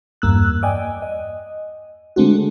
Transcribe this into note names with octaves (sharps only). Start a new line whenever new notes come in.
E2 G2 A#3 E6 F#6
D5 D#5 G5 G#5
D#5
D3 G#3 A3 C4 D4 F#4